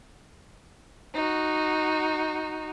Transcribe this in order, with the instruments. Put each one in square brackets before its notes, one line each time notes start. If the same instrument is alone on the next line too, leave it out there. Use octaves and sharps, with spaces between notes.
[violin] D#4 F#4